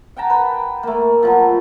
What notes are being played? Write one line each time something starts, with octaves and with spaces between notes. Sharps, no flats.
F#5 G5 A5 A#5
B4 G5
A3 A#3
F3 F#3 B3